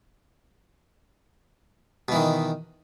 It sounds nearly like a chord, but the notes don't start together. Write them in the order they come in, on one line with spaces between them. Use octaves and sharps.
B2 E3 D#3